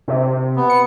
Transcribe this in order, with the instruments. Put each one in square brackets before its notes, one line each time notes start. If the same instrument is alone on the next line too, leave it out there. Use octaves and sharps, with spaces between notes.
[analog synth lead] C3
[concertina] B3
[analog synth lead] C#7